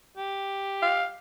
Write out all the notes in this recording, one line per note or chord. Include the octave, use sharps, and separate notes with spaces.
G4
F5